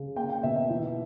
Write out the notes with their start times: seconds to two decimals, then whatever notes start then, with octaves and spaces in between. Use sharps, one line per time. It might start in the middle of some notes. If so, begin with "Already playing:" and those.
Already playing: C#3
0.16 A#3 G5
0.29 G5
0.43 B2 E5
0.56 E5
0.70 E3